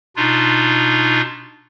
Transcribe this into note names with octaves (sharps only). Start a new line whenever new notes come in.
B2 D4 D#4 F4